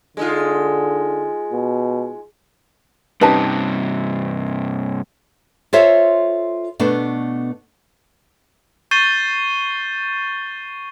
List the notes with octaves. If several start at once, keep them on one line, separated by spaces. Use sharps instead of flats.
D3 G#3 D#4 F4
B2
G2 C3 C#4 D#4 G4 B4 A5
F4 A4 C5 C#5 E5
B2 A3 B3 D4
C#6 G6 A6 C7 D#7 G7